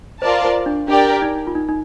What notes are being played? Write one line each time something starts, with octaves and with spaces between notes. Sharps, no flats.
F4 A#4 C5 D5 A5
C5
D4
D4 G4 A#4 D5 G5
D#4
F4
D#4
D#4